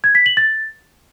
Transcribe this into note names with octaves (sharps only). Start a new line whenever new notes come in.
G#6
B6
F#7
A6